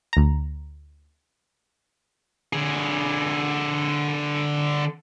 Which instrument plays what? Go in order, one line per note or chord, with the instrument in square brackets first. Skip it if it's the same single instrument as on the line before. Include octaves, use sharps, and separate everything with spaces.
[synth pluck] D2 A#5
[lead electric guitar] D3 G#4